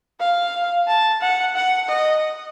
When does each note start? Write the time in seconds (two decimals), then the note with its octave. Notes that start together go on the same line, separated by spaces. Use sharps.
0.20 F5
0.87 A5
1.21 F#5
1.56 F#5
1.88 D#5